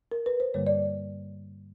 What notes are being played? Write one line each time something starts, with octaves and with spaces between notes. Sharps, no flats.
A#4
B4
C5
G2 D3 G3 A#3 C#5
D5